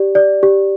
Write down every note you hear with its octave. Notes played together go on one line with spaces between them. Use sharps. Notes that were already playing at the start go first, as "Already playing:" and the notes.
Already playing: G4 D5
D5
G4